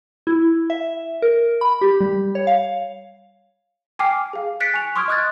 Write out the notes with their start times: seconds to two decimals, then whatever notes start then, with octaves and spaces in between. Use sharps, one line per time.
0.27 E4
0.70 E5
1.22 A#4
1.61 B5
1.81 G4
2.01 G3
2.35 C#5
2.47 F5
3.99 G5 G#5 D6 F6 C7
4.33 G#4 F5
4.60 F#6 A6 B6 C#7 D7
4.74 G#5 C#6 F7
4.96 C6 C#6 D#6 F6 G#6 D7
5.08 D#5 C#6 D#6 F#6 G#6 A6